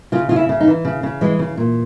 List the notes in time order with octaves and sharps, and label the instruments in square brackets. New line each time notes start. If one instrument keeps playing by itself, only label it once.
[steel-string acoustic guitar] C#3 F4
C#3 F4
E4
C#3
D#4
E3
C#3
C#3
E3 G#3
C#3
A#2